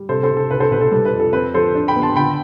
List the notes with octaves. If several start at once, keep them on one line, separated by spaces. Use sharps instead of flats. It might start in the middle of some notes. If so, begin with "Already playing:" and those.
Already playing: G3
C3 A4 C5
A4 C5
C3
A4
C2 B4
A4 C5
B2 B4
A4
G3 A4
B4
F2
A4
C4 B4
F3 A4 C5
D4
G5 B5
B3
A5 C6
D3 G5 B5